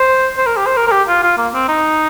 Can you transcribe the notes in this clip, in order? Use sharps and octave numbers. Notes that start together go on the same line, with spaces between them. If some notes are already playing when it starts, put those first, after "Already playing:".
Already playing: C5
C5
A#4
G4
C5
A#4
A#4
G4
F4
F4
A#3
C4
D#4